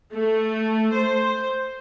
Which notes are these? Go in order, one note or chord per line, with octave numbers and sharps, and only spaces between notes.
A3
C5